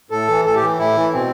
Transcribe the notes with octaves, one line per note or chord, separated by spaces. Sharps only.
A2 A4
E3
A2 A4
G4
E3
A2 E4
E3
B2 C4